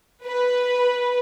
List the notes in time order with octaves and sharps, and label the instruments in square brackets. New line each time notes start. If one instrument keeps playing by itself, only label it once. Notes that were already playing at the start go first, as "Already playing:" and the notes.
[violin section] B4